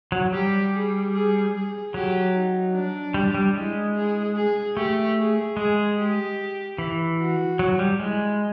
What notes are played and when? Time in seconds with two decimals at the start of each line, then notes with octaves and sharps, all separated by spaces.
0.12 F#3
0.33 G3 G4
0.73 G#4
1.13 G#4
1.53 G#4
1.94 F#3 G4
2.34 D#4
2.74 D4
3.14 G3
3.34 G3
3.55 G#3 E4
3.95 G#4
4.36 G#4
4.76 A3 G4
5.17 G#4
5.57 G#3 G#4
5.98 G4
6.78 E3
7.19 F#4
7.59 F#3
7.79 G3
7.99 G#3 E4